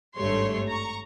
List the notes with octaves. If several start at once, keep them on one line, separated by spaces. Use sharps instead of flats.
G#1 G2 G3 A3 C#5 C6
A#5 C#6